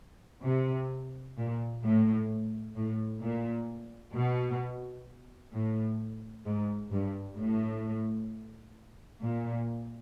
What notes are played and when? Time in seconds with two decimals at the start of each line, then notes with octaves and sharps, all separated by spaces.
0.45 C3
1.38 A#2
1.84 A2
2.76 A2
3.23 A#2
4.15 B2
5.53 A2
6.46 G#2
6.92 G2
7.38 A2
9.23 A#2